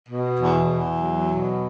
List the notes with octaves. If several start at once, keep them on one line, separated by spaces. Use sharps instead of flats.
B2
E2
E2
F#3
B2